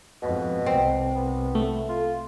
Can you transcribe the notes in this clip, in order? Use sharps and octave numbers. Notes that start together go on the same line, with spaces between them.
F2 G#2 B2
C2 C4
B3
A3
F4